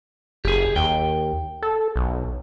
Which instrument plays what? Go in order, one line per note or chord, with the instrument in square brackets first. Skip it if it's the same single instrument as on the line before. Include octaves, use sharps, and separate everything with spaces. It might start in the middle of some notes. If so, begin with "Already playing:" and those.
[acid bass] F#1 [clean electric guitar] G4 G#4
[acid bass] D#2 [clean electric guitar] G5
[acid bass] A4
B1